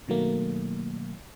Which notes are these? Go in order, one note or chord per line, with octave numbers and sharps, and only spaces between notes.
B2 D#3 F#3 A3 A#3